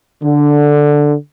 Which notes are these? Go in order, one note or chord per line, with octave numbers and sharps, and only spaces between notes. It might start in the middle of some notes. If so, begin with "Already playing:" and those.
D3